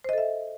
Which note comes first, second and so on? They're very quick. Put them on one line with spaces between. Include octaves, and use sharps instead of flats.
C5 D#5 A4 E5